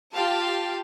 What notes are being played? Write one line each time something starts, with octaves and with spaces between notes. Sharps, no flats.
F4 G4 F5 G5 A5